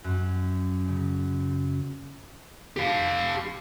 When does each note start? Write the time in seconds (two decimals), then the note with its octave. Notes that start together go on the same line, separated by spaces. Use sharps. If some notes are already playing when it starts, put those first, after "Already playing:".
0.04 F#2
0.88 C#3
2.77 G4 F5